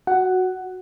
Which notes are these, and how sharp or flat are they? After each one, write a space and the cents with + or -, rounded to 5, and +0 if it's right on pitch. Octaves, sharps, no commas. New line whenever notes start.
F#4 +0 F#5 +10